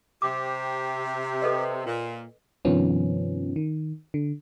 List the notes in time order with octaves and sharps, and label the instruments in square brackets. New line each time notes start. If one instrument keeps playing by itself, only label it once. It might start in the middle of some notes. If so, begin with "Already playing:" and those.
[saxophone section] C3 [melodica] G4 [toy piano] D6
[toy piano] A4 B4 D#5
[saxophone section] A#2
[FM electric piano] G2 C3 D#3 F3 B3 C#4
D#3
D3